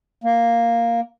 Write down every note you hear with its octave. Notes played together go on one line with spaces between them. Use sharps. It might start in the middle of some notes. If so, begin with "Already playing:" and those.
A#3